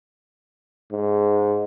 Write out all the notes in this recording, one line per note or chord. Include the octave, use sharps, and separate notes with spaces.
G#2